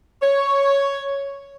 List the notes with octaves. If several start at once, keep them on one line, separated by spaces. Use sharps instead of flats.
C#5